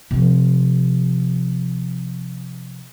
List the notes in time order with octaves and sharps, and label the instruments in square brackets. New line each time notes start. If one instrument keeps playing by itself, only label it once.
[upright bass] C3 F3